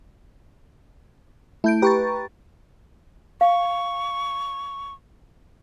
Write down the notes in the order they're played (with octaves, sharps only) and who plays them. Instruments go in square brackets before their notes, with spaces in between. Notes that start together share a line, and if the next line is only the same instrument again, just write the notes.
[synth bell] A3 G6 D7 [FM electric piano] E4
[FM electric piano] G4 B4 [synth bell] A#5 C#6 A6
[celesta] F5 [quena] C#6